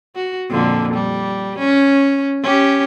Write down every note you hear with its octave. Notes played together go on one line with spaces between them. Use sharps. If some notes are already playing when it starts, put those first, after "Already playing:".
F#4
F2 A#2 D3
G3
C#4
C#4 G4